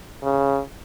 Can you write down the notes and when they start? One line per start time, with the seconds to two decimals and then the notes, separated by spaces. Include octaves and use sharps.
0.23 C#3